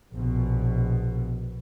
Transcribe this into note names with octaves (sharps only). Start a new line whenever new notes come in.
A#1 B2